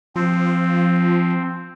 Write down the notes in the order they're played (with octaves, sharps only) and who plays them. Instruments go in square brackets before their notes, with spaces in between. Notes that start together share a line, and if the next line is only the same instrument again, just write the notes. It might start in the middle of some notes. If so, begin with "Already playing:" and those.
[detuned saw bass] F3 [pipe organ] C4